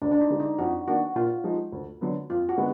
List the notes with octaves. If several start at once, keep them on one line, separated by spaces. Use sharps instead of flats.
D2 D4
D4
D#4
D3 G#3 D4
D#4
F2 F#4
D#3 A#3 D4 F#4
A#2 F4
F3 G#3 D#4
D2
D3 F#3 B3
F2 F4
F#4
D3 G#3 B3